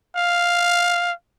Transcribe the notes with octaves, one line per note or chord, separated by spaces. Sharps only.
F5